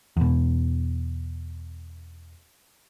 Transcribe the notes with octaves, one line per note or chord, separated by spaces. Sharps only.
E2 B2